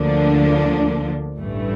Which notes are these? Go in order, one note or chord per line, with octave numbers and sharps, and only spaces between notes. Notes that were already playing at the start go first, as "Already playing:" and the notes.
Already playing: D2 D3 F3 A#3 D4
A1 G2 E3 A3